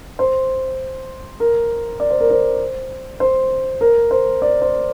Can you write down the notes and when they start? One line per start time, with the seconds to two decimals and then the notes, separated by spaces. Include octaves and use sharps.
0.19 C5
1.40 A#4
2.00 D5
2.10 C5
2.20 A#4
2.30 C5
3.20 C5
3.81 A#4
4.11 C5
4.42 D5
4.62 C5